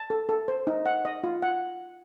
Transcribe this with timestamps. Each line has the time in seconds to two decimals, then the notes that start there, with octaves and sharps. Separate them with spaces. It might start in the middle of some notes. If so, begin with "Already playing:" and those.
Already playing: A5
0.10 A4
0.29 A4
0.48 C5
0.67 D#4
0.86 F#5
1.05 D#5
1.24 F4
1.42 F#5